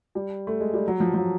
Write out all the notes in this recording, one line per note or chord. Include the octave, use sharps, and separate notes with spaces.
G3
A3
G#3
G3
F#3
F3
F3
F#3